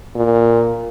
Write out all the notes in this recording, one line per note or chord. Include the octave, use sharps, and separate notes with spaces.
A#2